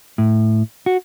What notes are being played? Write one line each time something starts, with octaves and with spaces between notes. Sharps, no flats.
A2
F#4